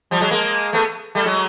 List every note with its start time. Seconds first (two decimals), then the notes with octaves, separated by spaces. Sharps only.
0.11 F3 G3
0.21 F#3 G#3
0.31 G#3 A#3
0.73 A3 B3
1.15 G3 A3
1.25 F#3 G#3